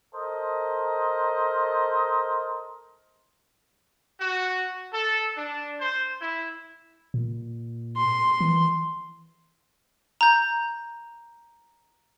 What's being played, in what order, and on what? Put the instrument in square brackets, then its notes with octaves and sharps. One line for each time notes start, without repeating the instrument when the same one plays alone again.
[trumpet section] A4 A#4 C5 D#5
F#4
A4
D4
C5
E4
[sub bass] A#2
[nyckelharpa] C6
[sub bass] E3
[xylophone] A#5 G6